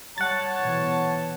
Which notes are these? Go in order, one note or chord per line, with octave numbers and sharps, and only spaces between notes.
G3 C#5 F#5 A5 A6
B2 E3